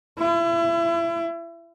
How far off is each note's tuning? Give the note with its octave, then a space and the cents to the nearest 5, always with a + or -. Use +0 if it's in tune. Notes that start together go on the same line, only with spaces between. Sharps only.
E4 +35